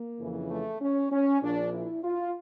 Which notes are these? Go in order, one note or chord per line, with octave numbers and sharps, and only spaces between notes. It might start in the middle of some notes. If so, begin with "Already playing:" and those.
Already playing: A#3
F2 C#3 E3
A3
C#4
C#4
A#1 A#2 F3 D4
E4
F4